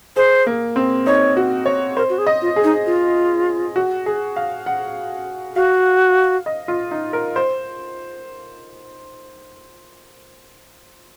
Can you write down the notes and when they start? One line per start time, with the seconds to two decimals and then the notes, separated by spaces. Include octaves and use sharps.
0.16 G#4 C5
0.47 A#3
0.76 C4
1.06 D#4 C#5
1.37 F#4
1.66 C#5
1.96 A#4 C5
2.10 F#4
2.18 G#4
2.27 D#5
2.42 F4
2.56 G#4
2.64 D#4
2.86 F4
3.76 F#4
4.06 G#4
4.36 F5
4.66 F#5
5.56 F#4 F5
6.46 D#5
6.68 F4
6.91 D#4
7.13 A#4
7.36 C5